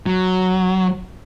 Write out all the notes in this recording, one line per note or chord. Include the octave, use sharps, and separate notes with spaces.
F#3